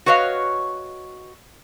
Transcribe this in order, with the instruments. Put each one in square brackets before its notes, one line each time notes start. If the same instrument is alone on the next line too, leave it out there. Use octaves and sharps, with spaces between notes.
[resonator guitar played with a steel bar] F#4 B4 C#5 D#5 F5